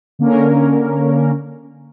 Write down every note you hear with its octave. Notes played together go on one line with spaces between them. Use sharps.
D3 A#3 C#4 A#4